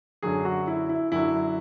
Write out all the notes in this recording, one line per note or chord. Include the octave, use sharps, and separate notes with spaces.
F#2 D3 F#3 G#4
F#4
E4
E4
F#2 D3 F#3 E4